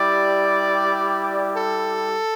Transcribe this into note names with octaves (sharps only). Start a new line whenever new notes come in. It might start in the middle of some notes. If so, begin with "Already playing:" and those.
Already playing: G3 E4 G4 D5
A4